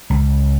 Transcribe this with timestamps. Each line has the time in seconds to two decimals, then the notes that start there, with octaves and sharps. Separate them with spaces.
0.10 C#2